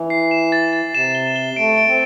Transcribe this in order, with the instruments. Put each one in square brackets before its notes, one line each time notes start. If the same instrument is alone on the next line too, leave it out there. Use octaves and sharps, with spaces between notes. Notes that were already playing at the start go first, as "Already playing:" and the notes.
Already playing: [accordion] E3
[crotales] C7
E7
A6
A6
[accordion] C3 [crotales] E7
[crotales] G7
G7
[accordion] A3 [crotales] D7
[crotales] D7
[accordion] C4